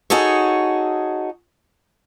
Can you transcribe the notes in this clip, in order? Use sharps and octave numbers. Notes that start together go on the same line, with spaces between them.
D#4 F#4 G#4 A4 C#5